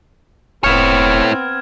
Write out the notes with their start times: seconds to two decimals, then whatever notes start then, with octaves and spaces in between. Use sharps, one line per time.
0.64 E1 B3 C4 E4 C#5 F6 G#6 E7